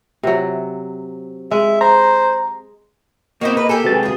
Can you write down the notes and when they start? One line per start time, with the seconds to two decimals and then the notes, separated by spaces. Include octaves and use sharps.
0.23 C3 F#3
1.51 G#3 E5
1.81 C5 A#5
3.41 A#3 C4 E4 F#4 D#5
3.57 B4
3.69 G4 A4 G#5
3.84 C3 G#3 F#4 B4 A6
4.03 F4 G#4